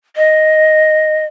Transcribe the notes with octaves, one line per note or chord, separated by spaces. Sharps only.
D#5